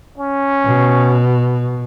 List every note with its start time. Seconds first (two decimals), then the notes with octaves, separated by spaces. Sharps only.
0.18 C#4
0.65 B2